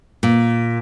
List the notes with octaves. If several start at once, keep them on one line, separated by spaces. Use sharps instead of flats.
A#2